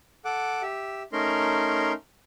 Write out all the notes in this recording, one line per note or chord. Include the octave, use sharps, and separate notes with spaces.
A4 F#5 D6
G4 E5
A3 C#4 D#4 A#4 A#5 C6